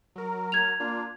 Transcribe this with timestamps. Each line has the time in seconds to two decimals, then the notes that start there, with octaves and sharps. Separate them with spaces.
0.16 F#3 A#4
0.52 G#6 F7
0.80 A#3 D4 F4